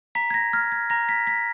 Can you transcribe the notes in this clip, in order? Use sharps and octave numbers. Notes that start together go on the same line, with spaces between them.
A#5 B6
G#6
A#6
F6 G#6
G#6
A#5 A#6
B6
F6 B6